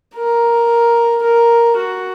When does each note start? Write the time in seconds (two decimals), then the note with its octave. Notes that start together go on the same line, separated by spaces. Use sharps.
0.15 A#4
1.23 A#4
1.77 F#4